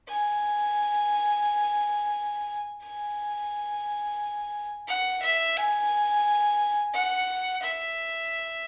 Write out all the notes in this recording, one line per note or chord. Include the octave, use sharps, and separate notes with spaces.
G#5
G#5
F#5
E5
G#5
F#5
E5